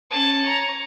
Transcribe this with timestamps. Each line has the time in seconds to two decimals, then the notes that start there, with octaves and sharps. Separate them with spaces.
0.10 C#4 A5
0.44 C#5 A#5